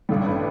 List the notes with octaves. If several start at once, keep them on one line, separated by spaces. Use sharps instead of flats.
A1 G2 D3 G3
B4